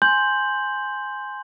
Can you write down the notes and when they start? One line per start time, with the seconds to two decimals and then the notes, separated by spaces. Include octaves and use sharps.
0.02 G#5 C6 G6 F#7